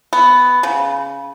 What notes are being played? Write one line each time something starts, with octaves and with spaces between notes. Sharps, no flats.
B3
C#3